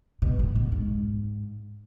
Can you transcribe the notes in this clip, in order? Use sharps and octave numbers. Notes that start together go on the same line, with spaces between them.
B2
A2
B2
G#2